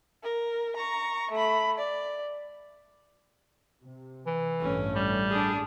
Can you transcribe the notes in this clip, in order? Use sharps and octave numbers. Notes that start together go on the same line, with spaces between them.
A#4
A#5 C#6
A3 B5
D5
C3
E3
A1 G2 A3 C#4
G3
D4 G#4